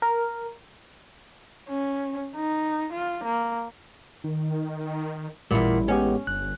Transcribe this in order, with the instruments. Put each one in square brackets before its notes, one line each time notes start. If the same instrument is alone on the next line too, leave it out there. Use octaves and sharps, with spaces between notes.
[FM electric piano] A#4
[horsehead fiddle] C#4
D#4
F4
A#3
[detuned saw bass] D#3
[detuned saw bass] A1 [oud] E2 A#2 [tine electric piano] G3 E4
[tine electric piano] G#3 B3 G4 [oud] C#4
[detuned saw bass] G1 [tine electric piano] F#6